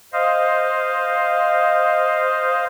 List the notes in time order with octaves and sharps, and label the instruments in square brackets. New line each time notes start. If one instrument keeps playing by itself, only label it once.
[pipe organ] C5 D#5 F5